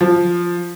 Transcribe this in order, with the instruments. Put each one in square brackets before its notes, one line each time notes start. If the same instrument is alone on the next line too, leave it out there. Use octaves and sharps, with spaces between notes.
[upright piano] F3